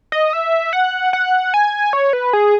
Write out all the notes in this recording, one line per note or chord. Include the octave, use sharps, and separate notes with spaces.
D#5
E5
F#5
F#5
G#5
C#5
B4
G#4